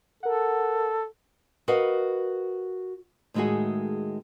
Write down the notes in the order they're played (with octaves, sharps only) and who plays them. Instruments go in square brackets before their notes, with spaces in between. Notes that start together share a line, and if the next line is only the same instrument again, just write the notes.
[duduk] A4 [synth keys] A#4 F#5
[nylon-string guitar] F#4 A#4 B4 D#5 F5 F#5
A2 D#3 G#3 A3 F#4 G#4